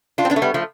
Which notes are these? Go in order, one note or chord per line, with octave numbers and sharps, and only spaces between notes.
D4 F4
C4
B3 D4
A3
G3 B3
F3 A3